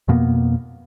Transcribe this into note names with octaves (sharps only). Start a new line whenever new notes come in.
F2 B2 A#3 B3